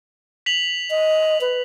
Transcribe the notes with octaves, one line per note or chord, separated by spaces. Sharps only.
B6 F7 F#7
D#5
B4